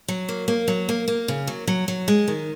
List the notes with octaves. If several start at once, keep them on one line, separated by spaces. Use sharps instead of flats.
F#3
A#3
A#3
F#3
A#3
A#3
C#3
F#3
F#3
F#3
G#3
D#3